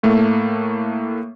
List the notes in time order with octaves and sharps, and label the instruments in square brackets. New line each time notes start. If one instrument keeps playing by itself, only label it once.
[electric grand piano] A2 A3 A#3